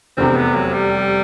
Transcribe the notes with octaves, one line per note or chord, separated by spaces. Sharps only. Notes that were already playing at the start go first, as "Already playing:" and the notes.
F1 E2 C3 C4
B3
F#3
G3